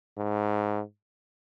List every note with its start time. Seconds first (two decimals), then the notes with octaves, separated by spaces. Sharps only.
0.17 G#2